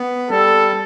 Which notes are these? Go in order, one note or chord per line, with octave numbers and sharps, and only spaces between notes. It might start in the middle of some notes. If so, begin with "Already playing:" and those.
Already playing: B3
G3 A4